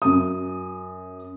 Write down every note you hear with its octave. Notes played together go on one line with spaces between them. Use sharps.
F#2 D#6